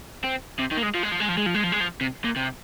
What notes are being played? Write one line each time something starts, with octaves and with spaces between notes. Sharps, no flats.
C4
C3
D#3
A#3
G#3
F3
G#3
F3
G#3
F3
G#3
F3
G#3
F3
G#3
F3
C3
A#2
C3